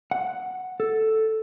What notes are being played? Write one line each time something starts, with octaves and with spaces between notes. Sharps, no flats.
F#5
A4